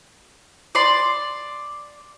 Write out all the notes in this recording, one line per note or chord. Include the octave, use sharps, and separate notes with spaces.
D5 C6